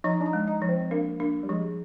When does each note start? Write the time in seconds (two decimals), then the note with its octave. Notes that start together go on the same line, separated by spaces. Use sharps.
0.04 F3 D#4
0.21 D4
0.26 D#4
0.33 G#3
0.47 D#4
0.62 F3
0.69 C4
0.91 A#3 D4
1.20 A#3 D4
1.43 G3
1.49 F3 G#3